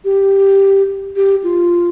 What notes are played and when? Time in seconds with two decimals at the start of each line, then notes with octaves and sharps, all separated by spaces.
0.05 G4
1.16 G4
1.44 F4